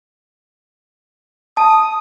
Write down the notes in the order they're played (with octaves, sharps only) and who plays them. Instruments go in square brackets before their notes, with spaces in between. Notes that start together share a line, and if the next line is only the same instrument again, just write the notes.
[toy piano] A5 [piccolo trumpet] D#6